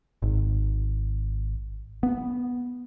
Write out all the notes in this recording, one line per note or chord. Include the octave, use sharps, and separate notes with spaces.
G#1
B3